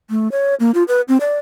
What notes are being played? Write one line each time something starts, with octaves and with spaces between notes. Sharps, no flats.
A3
C#5
A#3
F4
B4
C4
D5